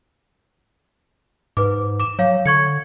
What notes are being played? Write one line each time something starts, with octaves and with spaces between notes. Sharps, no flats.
G#2 B4 D6
D6 E7
F#3 C#5 F5
D3 C#6 G#6 C#7